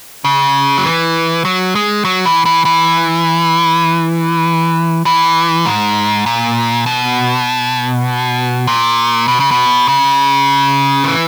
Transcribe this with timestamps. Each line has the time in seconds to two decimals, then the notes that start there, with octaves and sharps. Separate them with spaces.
0.25 C#3
0.77 F#3
0.85 E3
1.45 F#3
1.75 G#3
2.05 F#3
2.26 E3
2.45 E3
2.65 E3
5.06 E3
5.66 G#2
6.26 A#2
6.86 B2
8.67 A#2
9.28 B2
9.40 C#3
9.51 B2
9.88 C#3
11.04 D#3
11.08 E3